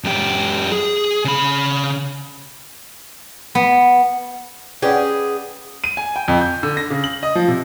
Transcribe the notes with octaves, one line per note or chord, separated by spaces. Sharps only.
F#2 G4
G#4
C#3 B5
B3
C#4 G4 G#4 B4 D5 F#5
D#7
G#5
G5
F2
G6
D3
A#6
C#3
F#7
D#5
F3
C3